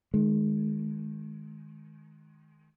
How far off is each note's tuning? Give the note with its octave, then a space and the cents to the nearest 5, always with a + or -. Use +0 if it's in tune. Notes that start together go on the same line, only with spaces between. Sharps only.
D#3 +0 G#3 +25